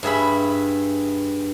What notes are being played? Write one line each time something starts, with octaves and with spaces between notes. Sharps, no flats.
G2 G#4 E5 B5